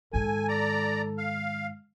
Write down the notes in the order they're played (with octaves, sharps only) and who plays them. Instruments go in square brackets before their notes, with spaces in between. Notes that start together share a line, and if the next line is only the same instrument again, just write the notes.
[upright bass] G#2 D#3 [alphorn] A4 [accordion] G#5
[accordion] D5 A#5
F5